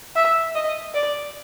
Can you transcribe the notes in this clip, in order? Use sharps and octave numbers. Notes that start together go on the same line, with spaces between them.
E5
D#5
D5